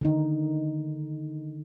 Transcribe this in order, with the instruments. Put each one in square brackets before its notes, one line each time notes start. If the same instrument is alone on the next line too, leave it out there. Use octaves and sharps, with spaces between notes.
[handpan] D3 D#3 D#4